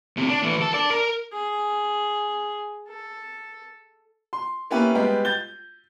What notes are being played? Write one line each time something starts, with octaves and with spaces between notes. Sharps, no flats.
A2 C3
D4
E3 A3
A4
D5 A5
A#4
G#4
A4
C6
A#3 B3 C#4 E4 G4 B4
G3 G#3 B3 G4
G6 A6 G7